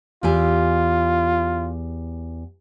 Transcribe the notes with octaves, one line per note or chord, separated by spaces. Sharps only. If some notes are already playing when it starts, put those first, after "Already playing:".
E2 F4 G4 G#5